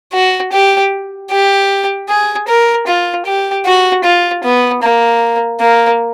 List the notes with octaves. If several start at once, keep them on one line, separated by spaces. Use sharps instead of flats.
F#4
G4
G4
G#4
A#4
F4
G4
F#4
F4
B3
A#3
A#3